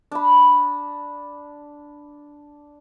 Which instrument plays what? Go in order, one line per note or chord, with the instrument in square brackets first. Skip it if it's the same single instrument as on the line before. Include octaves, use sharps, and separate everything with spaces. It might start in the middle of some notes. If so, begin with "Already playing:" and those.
[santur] D4 B5